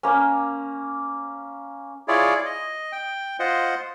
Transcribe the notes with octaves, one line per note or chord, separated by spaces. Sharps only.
A#3 C#4
E4 F4 G#4 C#5 D5
D#5
G5
F4 C5 D#5 F#5